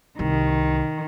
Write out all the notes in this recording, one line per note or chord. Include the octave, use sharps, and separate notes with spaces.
C2 D#3